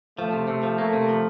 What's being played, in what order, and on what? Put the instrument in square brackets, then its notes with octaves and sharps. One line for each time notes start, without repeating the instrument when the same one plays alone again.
[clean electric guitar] F3 [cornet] A3
[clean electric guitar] C3
[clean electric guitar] C3 [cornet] A3
[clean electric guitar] F3
[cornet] A3 [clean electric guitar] A#3
[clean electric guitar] C3
F3